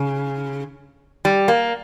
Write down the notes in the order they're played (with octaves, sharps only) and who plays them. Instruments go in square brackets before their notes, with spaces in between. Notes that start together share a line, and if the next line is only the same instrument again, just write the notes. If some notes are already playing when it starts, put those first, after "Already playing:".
Already playing: [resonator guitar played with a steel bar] C#3
G3
A#3